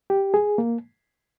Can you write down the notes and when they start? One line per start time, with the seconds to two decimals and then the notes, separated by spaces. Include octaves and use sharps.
0.10 G4
0.34 G#4
0.58 A#3